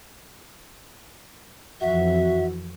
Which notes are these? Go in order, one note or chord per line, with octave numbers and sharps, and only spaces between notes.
F2 E3 F#4 E5